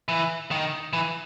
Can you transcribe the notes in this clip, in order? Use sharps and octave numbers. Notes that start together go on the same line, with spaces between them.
E3
D#3
E3